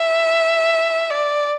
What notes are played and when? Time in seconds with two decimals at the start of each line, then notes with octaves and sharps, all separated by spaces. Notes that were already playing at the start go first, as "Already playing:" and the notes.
Already playing: E5
1.10 D5